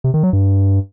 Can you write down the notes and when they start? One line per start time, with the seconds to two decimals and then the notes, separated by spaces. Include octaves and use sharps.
0.04 C3
0.14 D#3
0.23 F#3
0.33 G2